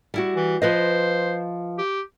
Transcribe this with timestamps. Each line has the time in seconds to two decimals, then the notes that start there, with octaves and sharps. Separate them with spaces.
0.14 G3 E4 F#4
0.36 E3
0.62 F3 B4 C5 D#5
1.78 G4